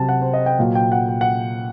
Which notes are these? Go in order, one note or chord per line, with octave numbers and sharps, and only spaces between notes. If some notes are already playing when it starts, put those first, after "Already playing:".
Already playing: C3 F#3 G5 A5
F#5
C5
D#5
G5
A#2 F#3
G5
F#5
G5
F#5